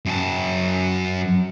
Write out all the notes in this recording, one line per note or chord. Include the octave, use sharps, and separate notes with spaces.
F#2 A5